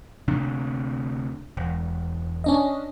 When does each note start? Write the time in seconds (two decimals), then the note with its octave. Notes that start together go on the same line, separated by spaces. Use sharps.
0.28 D2 C3 D4
1.57 E1
2.44 C#4 D4 D#5